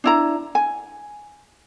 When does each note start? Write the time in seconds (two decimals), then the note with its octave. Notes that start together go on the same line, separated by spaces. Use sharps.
0.04 D4 E4 A#5
0.55 G#5